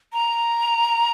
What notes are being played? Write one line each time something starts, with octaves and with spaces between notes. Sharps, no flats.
A#5